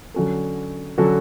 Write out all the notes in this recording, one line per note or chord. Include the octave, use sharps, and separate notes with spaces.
D3 F#3 C#4 F#4 A4
D3 F#3 C#4 F#4 A4